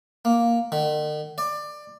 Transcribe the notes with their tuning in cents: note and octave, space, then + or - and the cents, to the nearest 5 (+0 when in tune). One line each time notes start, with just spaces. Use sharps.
A#3 +5
D#3 -45
D5 +20